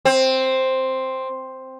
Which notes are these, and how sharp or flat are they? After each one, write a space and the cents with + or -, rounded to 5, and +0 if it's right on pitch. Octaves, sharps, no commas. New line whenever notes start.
C4 +5